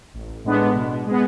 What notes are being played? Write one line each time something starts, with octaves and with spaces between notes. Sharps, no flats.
A1
A2 G#3 B3 D4
B2
G#3 B3